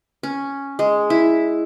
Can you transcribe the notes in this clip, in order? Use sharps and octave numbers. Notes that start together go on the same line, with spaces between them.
C#4
G#3
E4